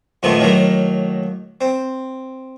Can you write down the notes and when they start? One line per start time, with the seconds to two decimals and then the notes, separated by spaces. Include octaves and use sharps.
0.23 F2 A#2 D#3 A3 B3
0.39 A2 D#3 F#3 A#3
1.61 C4